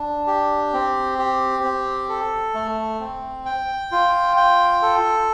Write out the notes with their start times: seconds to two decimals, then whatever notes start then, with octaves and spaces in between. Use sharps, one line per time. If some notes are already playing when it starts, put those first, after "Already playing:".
Already playing: D4
0.27 G4
0.74 C4
1.18 G4
1.64 C4
2.09 A4
2.54 A3
3.00 C4
3.46 G5
3.92 F4
4.37 G5
4.82 A4